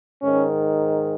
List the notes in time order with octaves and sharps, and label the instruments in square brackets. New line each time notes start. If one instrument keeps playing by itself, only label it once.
[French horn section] G#2 D#3 C#4